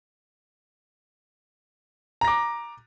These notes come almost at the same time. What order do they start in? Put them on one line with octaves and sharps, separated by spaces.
A#5 A#6 D6